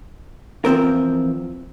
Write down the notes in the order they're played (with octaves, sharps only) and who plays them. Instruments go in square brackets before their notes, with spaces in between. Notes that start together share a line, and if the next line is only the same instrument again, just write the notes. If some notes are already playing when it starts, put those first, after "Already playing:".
[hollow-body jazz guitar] E2 F3 C4 A#4